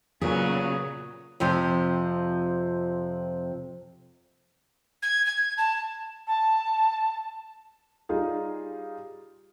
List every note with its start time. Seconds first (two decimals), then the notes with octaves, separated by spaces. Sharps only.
0.22 A#2 C#3 F#3 B3 G#4
1.40 F2 C3 F3
5.02 G#6
5.26 G#6
5.57 A5
6.27 A5
8.09 G3 D#4 F4 G#4